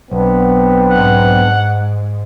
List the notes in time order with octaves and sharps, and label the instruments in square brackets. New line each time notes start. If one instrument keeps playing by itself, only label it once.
[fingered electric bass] B1 [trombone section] B3 C4 D4
[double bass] G#2 [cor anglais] F#5